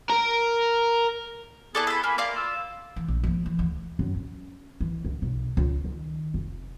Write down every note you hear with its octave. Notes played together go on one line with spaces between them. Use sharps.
A#4
B3 E4 G#4 A4 D5 A5
A4 B5
A#3 G#5 B5
A#3 F4 D5
E6
E3
A#1
F3 A#3
E3
D2 E3
F#2
C#4
E3
C#2
B1
C#2
D#3
F1